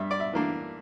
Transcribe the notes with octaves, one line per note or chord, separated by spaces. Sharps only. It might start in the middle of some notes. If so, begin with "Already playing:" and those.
Already playing: G2 E5
D5
E5
E3 A#3 D4